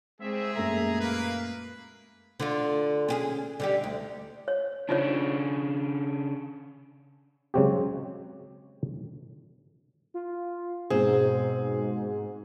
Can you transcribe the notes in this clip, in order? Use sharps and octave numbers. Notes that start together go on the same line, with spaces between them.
C2 G#3 C4 G#4 E5
F#2 A#2 A3 E5 A#5
A#3 B4
D3 F4
C#4 G4 G#4
D3 G3 G4
D2
C#5
C#3 D4 D#4 F4 C#5
C#3 F#3 G#3 C4 F#4 G4
F4
G#2 B2 C4 G#4